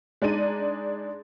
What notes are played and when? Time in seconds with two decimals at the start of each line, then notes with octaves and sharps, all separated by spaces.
0.22 G#3 D4 D#4 D#7